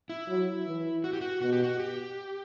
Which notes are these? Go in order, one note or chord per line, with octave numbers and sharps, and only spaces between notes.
E4
F#3
E3
F#4
G4
F#4
B2 F#4
G4
F#4
G4